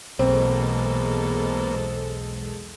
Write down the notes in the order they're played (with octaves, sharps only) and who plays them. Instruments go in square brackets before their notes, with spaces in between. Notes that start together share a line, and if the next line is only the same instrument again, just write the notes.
[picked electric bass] B1 [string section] E2 G#3 A4 [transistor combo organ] B2 A#3 [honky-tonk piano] C4